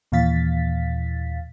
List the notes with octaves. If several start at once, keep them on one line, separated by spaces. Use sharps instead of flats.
D#2 A#2 E3 F5 A6 B6